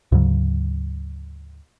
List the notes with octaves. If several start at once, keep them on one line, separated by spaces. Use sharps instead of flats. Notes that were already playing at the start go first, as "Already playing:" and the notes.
D2 G#2 C#3 F#3